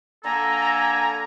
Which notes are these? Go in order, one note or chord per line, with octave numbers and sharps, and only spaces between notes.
D3 A#3 A4 G#5 A#5